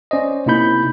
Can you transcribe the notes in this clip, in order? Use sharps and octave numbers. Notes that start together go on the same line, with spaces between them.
C#4 C5 D5 D#5
C3 A#3 D#4 E4 B5 G6